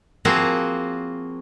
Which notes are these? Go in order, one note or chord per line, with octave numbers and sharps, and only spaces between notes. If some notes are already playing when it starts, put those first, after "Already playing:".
F3 A#3 C4 F#4 G#4